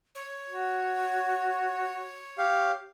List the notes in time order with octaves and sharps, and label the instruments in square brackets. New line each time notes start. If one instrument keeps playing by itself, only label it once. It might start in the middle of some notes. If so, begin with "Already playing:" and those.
[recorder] C#5
[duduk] F#4
[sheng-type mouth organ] G4 F5